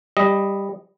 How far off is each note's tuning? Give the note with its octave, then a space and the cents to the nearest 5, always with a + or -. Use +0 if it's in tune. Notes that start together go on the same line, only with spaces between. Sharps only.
G3 +10 D#5 +0